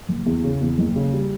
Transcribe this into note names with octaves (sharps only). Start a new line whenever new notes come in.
F#1
E2
C#3
E2
F#1
C#3
G3